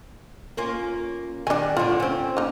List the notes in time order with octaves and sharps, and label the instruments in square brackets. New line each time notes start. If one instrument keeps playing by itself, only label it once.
[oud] A#3 C#4 F4
[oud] D#3 G3 [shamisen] D4 G#5
[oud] A2 D3 [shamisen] F4
[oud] C4 C#4
[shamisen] A#3 D#4